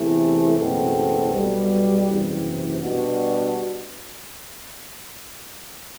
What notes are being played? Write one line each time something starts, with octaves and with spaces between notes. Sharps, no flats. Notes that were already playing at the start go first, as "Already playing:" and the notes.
Already playing: E2 C3 E3 A3
F#1 E2 B2 A3 C4
B1 B2 G3
F#1 E2 C3
B2 G3 D4 F#4